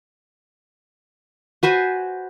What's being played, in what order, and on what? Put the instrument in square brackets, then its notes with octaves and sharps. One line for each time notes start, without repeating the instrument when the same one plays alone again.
[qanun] F#4 B4 C5 G#5